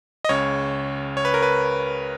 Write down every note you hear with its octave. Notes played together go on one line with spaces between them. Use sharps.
D#5
C#2 C#3 C#5
C#5
B4
A#4
B4